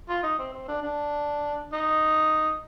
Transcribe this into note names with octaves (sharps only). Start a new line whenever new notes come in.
F4
D#4
C4
C4
D4
D4
D#4